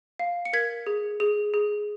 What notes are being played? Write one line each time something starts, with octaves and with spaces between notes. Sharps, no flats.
F5
C#7
A#4 G#6 B6
G#4
G#4
G#4